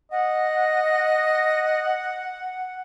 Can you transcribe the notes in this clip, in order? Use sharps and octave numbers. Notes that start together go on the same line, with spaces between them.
D#5 F#5